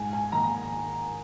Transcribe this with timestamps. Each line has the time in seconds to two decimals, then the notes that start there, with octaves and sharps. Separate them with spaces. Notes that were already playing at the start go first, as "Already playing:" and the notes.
Already playing: G#2 G#5
0.13 G#5
0.32 D#3 A#3 D#4 A#5